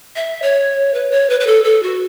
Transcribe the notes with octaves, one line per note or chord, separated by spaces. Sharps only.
E5
C#5
B4
C#5
B4
B4
A4
A4
F#4